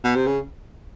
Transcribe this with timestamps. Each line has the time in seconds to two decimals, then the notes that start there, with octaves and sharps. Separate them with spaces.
0.04 B2
0.15 C3
0.27 C#3